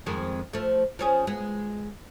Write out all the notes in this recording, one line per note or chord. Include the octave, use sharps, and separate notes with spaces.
F2 D#3 G#3
F3 A3
F3 C#4 G#4
G#3 B3